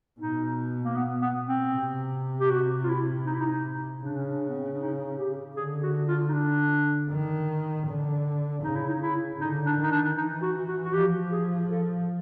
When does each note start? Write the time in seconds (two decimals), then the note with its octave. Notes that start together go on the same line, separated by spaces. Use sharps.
0.20 B2 D#4
0.84 A#3
0.96 B3
1.22 B3
1.48 C4
1.73 C3
2.40 G4
2.50 F#4
2.83 F4
2.88 E4
3.26 D#4
3.34 E4
3.41 D#4
4.03 C#3 D4
4.16 C#4
4.28 D4
4.48 B3
4.56 C4
4.64 C#4
4.72 D4
4.81 D#4
5.18 G4
5.56 D3 G#4
5.83 F#4
6.08 F4
6.28 D#4
6.33 D4
7.10 D#3
7.87 D3
8.63 C#3 D#4
8.75 E4
8.88 D#4
9.02 E4
9.40 D3 D#4
9.66 D4
9.78 D#3 D#4
9.91 D4
10.17 E3 D#4
10.42 F#4
10.68 F#4
10.85 F#4
10.94 F3 G4
11.31 G#4
11.70 A4